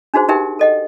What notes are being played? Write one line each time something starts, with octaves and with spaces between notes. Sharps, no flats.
D4 D#4 F#4 G#4 C5
D#4 G4 A#4 E5 G5
A4 D#5 F#5